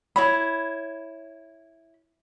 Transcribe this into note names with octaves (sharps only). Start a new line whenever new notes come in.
E4 C#5 B5